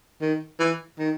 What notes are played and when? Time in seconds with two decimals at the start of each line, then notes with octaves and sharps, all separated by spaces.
0.21 D#3
0.59 E3
0.98 D#3